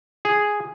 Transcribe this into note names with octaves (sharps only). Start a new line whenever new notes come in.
G#4